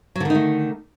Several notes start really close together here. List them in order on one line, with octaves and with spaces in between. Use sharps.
F#3 D3 D#3 D#4 A3